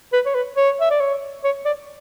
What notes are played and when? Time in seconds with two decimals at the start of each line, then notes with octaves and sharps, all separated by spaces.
0.13 B4
0.26 C#5
0.35 B4
0.57 C#5
0.80 E5
0.90 D5
1.00 C#5
1.44 C#5
1.65 D5